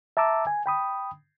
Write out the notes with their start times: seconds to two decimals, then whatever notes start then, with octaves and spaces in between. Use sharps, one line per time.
0.17 E5 A5 A#5 D6 E6
0.47 G#5
0.66 G5 B5 D#6